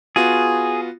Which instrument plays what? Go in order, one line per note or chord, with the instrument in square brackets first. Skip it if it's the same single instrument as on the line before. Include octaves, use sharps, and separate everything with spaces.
[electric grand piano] B3 F4 F#4 [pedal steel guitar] G#4